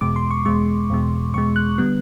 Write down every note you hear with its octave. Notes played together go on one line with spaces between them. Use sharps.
E2 B2 G#3 D6
C6
C#6
E2 B2 G#3 C#6
E2 B2 G#3
E2 B2 G#3 C#6
F#6
D3 G3 B3 F#6